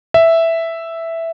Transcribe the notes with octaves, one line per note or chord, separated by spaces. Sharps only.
E5